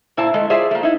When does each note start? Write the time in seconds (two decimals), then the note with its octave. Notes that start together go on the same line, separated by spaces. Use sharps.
0.17 A#2 E4 C5 A5
0.34 G#3 A3
0.50 F4 G#4 C5 D5 E5
0.71 A3 A#3
0.83 D#4 E4